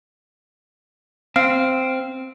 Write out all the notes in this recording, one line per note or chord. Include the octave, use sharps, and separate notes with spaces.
C4 F5 F6 C7